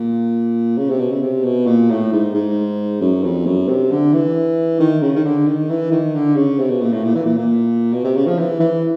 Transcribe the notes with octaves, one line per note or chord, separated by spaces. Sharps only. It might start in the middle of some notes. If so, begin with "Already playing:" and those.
Already playing: A#2
C#3
C3
B2
C#3
C3
B2
A#2
A2
G#2
G#2
F#2
F2
F#2
C3
D3
E3
D#3
C#3
D#3
D3
D#3
E3
D#3
D3
C#3
C3
B2
A#2
A2
A#2
E3
A#2
A#2
B2
C3
C#3
F3
E3
E3